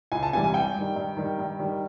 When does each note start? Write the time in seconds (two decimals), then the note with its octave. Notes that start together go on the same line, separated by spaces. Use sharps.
0.12 C#2 G#5
0.23 A5
0.33 C3 E3 G3 G#5
0.44 G#5
0.54 G2 G5
0.75 D#3 G3
0.96 G2
1.17 D#3 G3
1.39 G2
1.59 D#3 G3